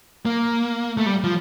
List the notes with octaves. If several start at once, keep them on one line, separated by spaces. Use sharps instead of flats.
A#3
A3
G3
F3